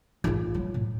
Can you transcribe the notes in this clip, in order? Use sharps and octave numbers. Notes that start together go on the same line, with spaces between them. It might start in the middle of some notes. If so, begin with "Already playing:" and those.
A1 F4
F#3
A2